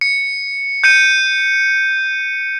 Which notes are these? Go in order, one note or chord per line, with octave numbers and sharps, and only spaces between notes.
C#7
G6 C#7 D#7